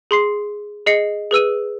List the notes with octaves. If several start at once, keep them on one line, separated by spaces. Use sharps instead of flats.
G#4 C6 C7
G#4 D#5 C7 C#7
G#4 B4 E6 D#7